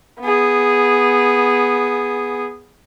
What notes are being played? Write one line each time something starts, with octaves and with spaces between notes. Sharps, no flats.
B3 G#4